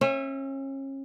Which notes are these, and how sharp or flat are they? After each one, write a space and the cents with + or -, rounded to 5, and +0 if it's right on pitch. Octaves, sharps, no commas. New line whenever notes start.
C#4 -35 E5 +0